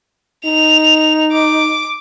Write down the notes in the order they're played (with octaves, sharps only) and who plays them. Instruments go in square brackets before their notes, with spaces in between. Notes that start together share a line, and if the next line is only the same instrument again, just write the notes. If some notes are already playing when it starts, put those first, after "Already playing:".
[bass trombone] D#4 [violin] F7
[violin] D6